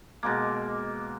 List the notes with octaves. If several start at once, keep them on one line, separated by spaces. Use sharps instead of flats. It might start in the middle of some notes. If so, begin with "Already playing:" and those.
B2 G#3 A#3